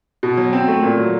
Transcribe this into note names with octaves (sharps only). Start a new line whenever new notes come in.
B2
F#3
C4
A3
A#2
F#3